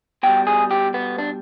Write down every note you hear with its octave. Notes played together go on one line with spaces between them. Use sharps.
B2 G3 G5
G#4
G4
B3
D4